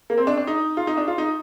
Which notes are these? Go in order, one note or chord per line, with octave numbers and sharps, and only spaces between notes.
A#3
C4
D4
D4
D#4
F4
D#4
D4
F4
D#4